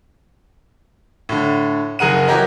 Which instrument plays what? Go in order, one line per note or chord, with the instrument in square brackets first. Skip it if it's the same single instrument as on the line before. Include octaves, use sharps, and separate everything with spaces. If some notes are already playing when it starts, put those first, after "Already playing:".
[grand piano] A2 D3
F#1 G#4 A#4 F#5 D#7
E3 F#3 G4 A#4 D#5